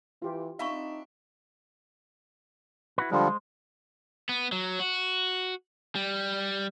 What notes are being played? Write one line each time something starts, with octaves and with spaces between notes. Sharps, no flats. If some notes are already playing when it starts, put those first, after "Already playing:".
E3 F4 G4
C4 D4 D#4 E5 F5 B5 C#6
E4 F#4 B4
D3 F3 G3 G#3 C5
B3
F#3
F#4
G3